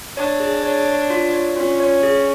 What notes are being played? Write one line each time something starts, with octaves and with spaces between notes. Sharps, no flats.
D4 C#5
G#4
C#5
C#5
F4
C#5
C#4 F4
C#5
G#4